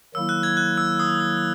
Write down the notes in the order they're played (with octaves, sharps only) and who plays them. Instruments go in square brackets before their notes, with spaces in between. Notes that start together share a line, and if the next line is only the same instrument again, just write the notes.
[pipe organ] D#3 F#3 A#3 E4 [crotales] E6
[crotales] F#6
G#6
F#6
E6
D#6
D#6
E6